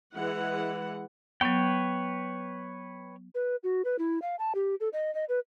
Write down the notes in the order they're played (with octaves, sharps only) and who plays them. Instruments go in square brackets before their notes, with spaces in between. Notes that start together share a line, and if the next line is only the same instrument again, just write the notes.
[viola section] E3 G#3 F#5
[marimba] F#3 B3 [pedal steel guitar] B4 C#5 G5
[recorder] B4
F#4
B4
E4
F5
A5
G4
A4
D#5
D#5
B4